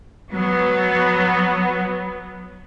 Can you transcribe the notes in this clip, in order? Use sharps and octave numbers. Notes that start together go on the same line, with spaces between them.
F#3 B3